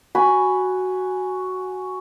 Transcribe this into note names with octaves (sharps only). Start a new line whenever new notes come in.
F#4 G#5 B5